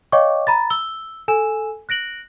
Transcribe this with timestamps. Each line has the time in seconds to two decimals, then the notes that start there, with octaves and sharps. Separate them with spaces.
0.12 C#5 D#5 F5 G5 C#6 D6
0.47 A#5 B5 A6
0.70 E6 G7
1.28 A4 G#5 E6 E7
1.89 F#6 A#6 D7 F#7